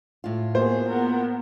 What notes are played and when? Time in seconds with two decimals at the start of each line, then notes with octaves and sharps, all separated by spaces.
0.24 A2 F4
0.55 A#3 B3 F#4 G#4 C5
0.88 B3 A#4